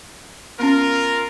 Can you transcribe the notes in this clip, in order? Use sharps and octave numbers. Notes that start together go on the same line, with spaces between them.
B3 C#4 F4 A#4